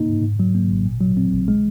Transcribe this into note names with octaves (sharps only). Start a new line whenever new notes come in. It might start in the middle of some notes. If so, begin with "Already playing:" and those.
Already playing: A#3 D#4
G#2
G#2
F#3
A#3
G#1
A#2
F#3
C4
A#1
G#3